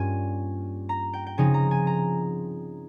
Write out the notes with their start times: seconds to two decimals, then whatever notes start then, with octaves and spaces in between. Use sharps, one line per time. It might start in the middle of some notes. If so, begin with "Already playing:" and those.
Already playing: G2 G3 A#3 C#4 F4 G#5
0.89 A#5
1.13 G5
1.26 G5
1.38 C#3 F3 C4 D#4 G#5
1.54 A#5
1.71 G#5
1.87 A#5